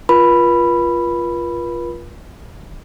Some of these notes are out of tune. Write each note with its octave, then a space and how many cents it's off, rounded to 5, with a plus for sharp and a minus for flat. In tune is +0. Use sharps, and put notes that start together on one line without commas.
F4 -5 B4 -45 B5 +0